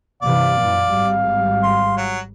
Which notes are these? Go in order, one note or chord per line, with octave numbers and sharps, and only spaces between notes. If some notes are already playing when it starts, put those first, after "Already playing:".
G2 C3 E3 D5 F5
F#2 A#2 E3
G#1 G#2 G3
C6
F#3